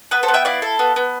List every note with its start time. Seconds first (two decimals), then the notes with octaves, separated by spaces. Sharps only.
0.11 B3 B4
0.23 A4 C5
0.28 B3
0.34 E5 G5
0.45 E4 D5 F5
0.62 A4
0.79 B3
0.96 B3